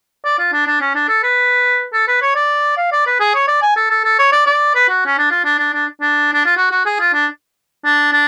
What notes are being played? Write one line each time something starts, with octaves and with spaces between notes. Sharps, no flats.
D5
F4
D4
D4
C#4
D4
A4
B4
A4
B4
C#5
D5
F5
D5
B4
G#4
C#5
D5
G#5
A4
A4
A4
C#5
D5
D5
B4
F#4
C#4
D4
F4
D4
D4
D4
D4
D4
F4
F#4
F#4
G#4
F4
D4
D4
D4